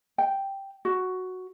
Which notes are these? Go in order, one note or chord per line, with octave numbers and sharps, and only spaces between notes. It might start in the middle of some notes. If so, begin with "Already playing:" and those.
G5
F#4